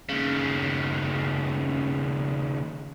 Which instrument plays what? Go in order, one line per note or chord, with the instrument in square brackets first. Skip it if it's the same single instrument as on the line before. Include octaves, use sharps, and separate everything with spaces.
[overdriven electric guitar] D#2 C#3